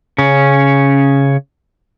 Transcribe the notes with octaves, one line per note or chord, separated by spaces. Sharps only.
C#3 C#4